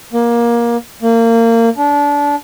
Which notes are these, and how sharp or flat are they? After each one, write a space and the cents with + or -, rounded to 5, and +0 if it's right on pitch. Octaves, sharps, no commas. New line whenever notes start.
A#3 +20
A#3 -25
D4 -25